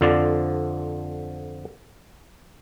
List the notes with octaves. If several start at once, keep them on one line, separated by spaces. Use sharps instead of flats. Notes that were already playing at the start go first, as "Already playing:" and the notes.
F2 D3 F3 D5